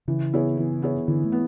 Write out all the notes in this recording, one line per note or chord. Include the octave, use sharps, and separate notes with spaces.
C#3 E3
B3 E4 G#4 C#5
E3
B3 E4 G#4 C#5
D3 E3
A3
B3